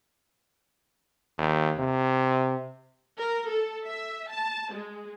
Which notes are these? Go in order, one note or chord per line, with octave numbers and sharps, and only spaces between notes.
D#2
C3
A#4
A4
E5
A5
G#3